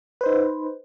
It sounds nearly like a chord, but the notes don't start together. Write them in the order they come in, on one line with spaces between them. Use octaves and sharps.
B4 C5 D#4